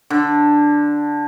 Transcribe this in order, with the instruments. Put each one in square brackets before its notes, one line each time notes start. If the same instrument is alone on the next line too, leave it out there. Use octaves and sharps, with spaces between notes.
[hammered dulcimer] D3